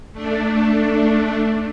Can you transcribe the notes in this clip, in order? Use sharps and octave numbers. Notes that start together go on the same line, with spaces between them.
A3 D4